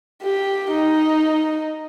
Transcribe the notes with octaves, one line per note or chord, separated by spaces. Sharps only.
G4
D#4